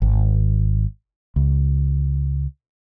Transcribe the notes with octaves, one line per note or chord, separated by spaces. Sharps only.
G#1
C#2